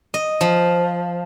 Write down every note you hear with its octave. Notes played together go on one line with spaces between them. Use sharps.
D#5
F3